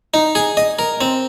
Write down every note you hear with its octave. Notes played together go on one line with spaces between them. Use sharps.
D#4
G#4
D#5
A#4
C4